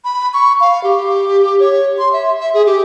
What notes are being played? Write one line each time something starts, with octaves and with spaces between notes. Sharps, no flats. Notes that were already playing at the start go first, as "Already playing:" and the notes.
B5
C#6
F5
G4
C#5
C6
E5
E5
G#4
G4